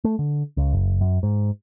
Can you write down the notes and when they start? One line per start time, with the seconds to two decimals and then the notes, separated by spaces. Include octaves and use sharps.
0.04 A3
0.19 D3
0.57 C#2
0.73 F#1
1.01 F#2
1.23 G#2